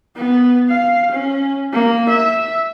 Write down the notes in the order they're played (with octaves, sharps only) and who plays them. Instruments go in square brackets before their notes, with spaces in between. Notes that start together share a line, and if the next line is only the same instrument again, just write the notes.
[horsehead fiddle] B3
F5
C#4
A#3
E5